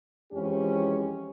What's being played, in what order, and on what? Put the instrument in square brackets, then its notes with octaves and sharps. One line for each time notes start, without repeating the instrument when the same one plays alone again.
[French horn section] F2 E3 G#3 C#4 G4